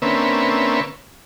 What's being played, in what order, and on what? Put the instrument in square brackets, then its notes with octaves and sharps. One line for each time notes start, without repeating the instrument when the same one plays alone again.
[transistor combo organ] D3 A#3 C4 C#4 B4 E5